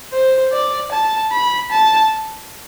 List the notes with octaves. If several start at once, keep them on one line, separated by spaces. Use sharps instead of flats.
C5
D5
A5
B5
A5